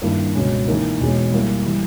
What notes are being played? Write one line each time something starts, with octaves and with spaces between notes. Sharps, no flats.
G2 D#3 A#3 E4
C#2 B2 G#3 C#4
E3 A#3 D#4 A#4
E2 B2 G#3 C#4 G#4
G3 A#3 E4
E3 G3